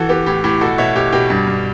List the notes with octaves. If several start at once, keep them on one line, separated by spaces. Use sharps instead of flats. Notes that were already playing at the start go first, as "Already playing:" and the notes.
Already playing: E3 F#4 A4
B3 G4
A2 G4
A2 G4
B2 F#4 A4
B2 C#5 E5
B2 G4
B2 G4
G2
G2